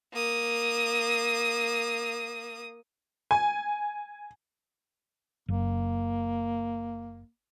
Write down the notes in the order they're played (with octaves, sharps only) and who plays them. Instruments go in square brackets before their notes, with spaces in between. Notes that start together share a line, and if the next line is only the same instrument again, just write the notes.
[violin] A#3 D#6
[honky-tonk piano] G#5
[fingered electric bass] F#1 [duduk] A#3